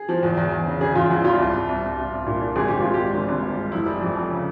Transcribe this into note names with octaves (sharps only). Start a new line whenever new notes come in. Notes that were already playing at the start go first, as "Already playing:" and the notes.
Already playing: G#4
F3
E2
E2
E2
C#3
C#3 G#4
E2 F4
E2 E4
G3 F4
C2
C2
C2
C2
C2
C2
A#2
A#2
G#1 G#4
G#1 G4
G#1 F4
G4
G#3
G#1
G#1
G2
G#3
F1 E4
G3
F2
F2
C#3